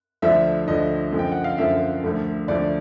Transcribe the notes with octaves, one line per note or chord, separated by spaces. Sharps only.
D2 D3 F3 A3 D4 E5
D2 D3 F3 A3 D4 D#5
F#2 D3 F3
G5
F#5
F5
F#2 D3 F3 E5
D2 D3 F3 A3
D2 D3 F3 A3 D5